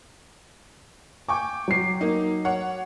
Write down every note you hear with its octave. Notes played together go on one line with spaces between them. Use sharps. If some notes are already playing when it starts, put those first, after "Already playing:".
G5 G#5 C#6 D6
F#3 C7
A#3 D#4
C#5 F#5